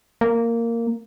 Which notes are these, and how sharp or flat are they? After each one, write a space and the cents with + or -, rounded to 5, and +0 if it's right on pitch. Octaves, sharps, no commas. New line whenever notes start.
A#3 -10